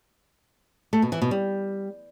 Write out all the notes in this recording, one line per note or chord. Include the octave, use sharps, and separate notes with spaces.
A3
B2
E3
B2
G3